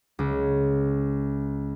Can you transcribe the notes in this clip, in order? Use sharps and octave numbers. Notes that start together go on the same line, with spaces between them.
C#2 C#4